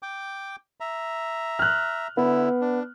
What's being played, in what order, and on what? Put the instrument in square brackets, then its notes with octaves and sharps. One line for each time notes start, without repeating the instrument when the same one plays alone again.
[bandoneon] G5 D6
E5 A#5
[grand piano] F6 F#6
[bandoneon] D3 E4 [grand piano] B3
[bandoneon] D4